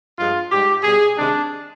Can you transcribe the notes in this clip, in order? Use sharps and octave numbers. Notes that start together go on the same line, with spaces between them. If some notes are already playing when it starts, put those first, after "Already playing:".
G2 F3 G#3 F4
G#2 G3 G4
B2 G3 G#4
C3 D#3 G#3 D4